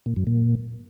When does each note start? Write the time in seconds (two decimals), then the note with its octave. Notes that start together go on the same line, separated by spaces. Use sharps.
0.06 A#2
0.16 F#2
0.27 A#2